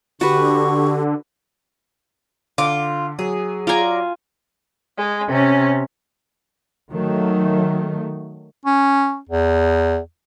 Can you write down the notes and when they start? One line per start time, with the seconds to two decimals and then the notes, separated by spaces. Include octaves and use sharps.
0.21 D3 F#4 G4 B4 C#6
2.58 D3 F4 D6
3.19 F#3 G#4
3.67 F4 D5 G#5 A#5
4.97 G#3
5.28 C3 C#4
6.91 D#3 F#3 A3
8.65 C#4
9.29 E2